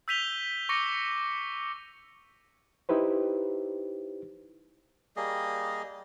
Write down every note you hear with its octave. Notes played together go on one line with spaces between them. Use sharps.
E6 G6 B6 D#7 F7 G7
C#6 D6 A#6 C#7
D#4 E4 G4 B4 C5
G3 A#3 G#4 D#5